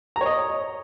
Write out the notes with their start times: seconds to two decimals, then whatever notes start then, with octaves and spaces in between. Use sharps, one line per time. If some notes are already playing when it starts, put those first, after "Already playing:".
0.16 A#5
0.21 C#5
0.26 D#5